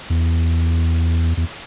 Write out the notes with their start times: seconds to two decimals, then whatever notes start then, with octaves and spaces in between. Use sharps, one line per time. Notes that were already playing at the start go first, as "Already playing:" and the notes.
0.10 E2
1.37 E2